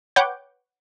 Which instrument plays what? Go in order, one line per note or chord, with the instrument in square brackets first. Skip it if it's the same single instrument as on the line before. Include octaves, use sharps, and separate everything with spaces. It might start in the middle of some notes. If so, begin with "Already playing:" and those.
[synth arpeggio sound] B4 C#5 F#5 G5 D6 G6